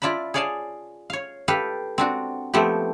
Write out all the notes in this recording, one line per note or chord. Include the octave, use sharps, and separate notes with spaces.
E4 F4 D5 A5 B5
G#4 C#5 D5 F5 G#5 A5
C#5 F5
G4 A4 B4 F5
C4 D4 F#4
F3 A3 B3 C4 G4